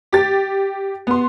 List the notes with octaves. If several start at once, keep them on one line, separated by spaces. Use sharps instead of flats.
G4 A6
B3 C6